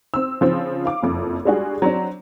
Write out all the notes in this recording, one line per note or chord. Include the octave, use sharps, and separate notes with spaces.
C4 E6
C#3 F3 C4
F5 D6
F#1 F2
G3 G#3 D4 F#4 G#4
F#3 C4 D4